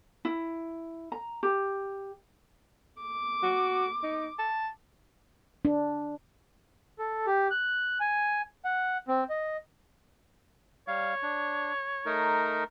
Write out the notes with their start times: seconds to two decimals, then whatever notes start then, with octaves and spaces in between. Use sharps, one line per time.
0.25 E4
1.12 A#5
1.43 G4
3.02 D6
3.43 F#4
4.03 D#4
4.39 A5
5.65 D4
6.99 A4
7.26 G4
7.51 F#6
8.00 G#5
8.65 F#5
9.08 C4
9.30 D#5
10.88 G3 C#5 F5
11.23 D4
12.06 A3 D#4 A#4